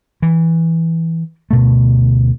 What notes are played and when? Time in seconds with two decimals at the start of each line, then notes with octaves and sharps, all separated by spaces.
0.22 E3
1.51 D2 B2 A3